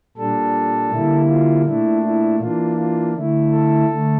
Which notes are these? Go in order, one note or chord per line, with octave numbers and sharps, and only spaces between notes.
A#2 G3 D4 A4
D3 G3 A#3 E4
F4
A#2 A3 D4 E4
E4
E3 A#3 D4 F4
F4
D3 A3 E4
A4
D3 A3